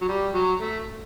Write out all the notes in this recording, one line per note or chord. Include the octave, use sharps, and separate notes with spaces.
F#3
G3
F#3
A3